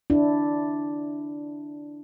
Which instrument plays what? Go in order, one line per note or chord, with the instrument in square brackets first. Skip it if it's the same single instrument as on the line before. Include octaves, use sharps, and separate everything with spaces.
[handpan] D4 E4